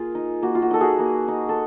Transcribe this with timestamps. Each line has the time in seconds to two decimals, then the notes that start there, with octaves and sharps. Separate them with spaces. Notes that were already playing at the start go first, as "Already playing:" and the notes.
Already playing: A#3 F4 G#4 A#4
0.15 D#4
0.42 A#3 F#4
0.55 F4
0.62 F#4
0.71 D#4 A4
0.81 F#4 G#4
0.99 A#3
1.28 D#4
1.49 A4